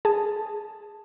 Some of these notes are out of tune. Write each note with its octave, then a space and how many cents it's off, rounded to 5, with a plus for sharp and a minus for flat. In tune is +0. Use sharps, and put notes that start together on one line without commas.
G#4 +0 A5 +0